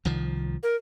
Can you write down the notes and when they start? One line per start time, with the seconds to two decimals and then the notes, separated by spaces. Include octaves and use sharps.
0.05 C2 D#3 F3
0.63 A#4